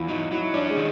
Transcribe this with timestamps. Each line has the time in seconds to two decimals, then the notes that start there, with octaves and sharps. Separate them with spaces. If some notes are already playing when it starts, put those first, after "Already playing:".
Already playing: E2 E4 F4
0.08 F#3 D#4
0.32 F#3 E4
0.54 C#4 D4
0.70 G#3
0.77 D#3